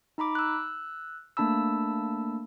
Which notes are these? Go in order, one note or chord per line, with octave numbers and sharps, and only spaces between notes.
D#4 A#5 B5 D6
E6 F#6
A3 A#3 D4 A5 B5 E6